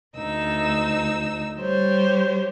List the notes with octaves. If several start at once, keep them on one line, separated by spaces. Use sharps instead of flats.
D2 D#4 E6
G3 G4 C5 C#5